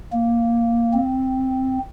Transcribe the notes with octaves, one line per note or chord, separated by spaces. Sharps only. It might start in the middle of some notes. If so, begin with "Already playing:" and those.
A#3
C4